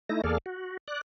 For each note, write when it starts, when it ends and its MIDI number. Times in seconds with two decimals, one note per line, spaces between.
0.09 0.22 57
0.09 0.22 63
0.09 0.22 64
0.09 0.22 94
0.24 0.38 40
0.24 0.38 58
0.24 0.38 68
0.24 0.38 69
0.24 0.38 74
0.24 0.38 89
0.46 0.77 66
0.88 1.01 74
0.88 1.01 90